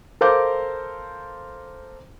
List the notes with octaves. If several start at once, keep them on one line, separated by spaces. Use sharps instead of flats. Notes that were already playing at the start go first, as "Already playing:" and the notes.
A4 A#4 C5 F5 D6 G6